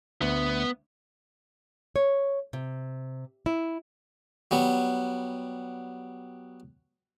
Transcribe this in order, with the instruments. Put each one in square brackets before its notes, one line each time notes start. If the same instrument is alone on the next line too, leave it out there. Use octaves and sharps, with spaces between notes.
[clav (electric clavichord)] D2 [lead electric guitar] B3
[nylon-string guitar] C#5
C3
E4
[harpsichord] F#3 G3 B3